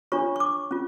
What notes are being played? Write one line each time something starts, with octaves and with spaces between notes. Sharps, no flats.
D4 F4 C#5 C#6
C#6
D6
C#4 F4